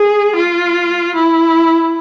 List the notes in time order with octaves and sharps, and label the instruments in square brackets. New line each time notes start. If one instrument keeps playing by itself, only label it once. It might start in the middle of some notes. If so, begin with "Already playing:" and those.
Already playing: [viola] G#4
F4
E4